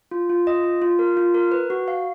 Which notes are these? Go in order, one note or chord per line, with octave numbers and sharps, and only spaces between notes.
F4
F4
D#5
F4
F4
A#4
F4
A#4
B4
F#4
F5